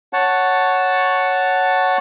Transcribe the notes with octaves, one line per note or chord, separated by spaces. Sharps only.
C#5 F#5 A5